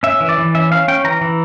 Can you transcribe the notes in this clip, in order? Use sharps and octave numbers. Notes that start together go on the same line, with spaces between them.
C#4 E5
E3
D5
E3
C#4 E5
C#4 F5
C#4 G5
E3 A#5
E3